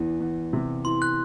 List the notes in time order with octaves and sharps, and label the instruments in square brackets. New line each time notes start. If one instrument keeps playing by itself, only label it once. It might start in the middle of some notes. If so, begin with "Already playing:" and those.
Already playing: [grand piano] E2 E3
E2
C3
[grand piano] E3 [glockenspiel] C6
[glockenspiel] F#6